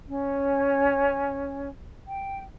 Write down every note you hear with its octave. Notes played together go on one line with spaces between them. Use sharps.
C#4
G5